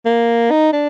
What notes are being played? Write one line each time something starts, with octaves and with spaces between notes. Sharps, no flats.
A#3
D#4
D4